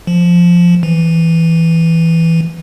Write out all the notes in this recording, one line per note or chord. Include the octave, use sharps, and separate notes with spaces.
F3
E3